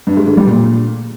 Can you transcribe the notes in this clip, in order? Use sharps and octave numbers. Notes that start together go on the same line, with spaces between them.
G2
G#3
D3
G3
A#2